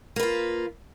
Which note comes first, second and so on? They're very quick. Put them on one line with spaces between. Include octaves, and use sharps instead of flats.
A#3 B4 F4